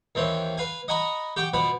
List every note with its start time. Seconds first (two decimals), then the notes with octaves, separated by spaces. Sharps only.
0.15 D#2 E3 C4 C#4
0.58 B4 F5 G#5
0.88 D#5 F#5 G#5 A#5 B5 C#6
1.36 G4 F#5 G5 C#6 D6
1.54 B2 F3 F#5 B5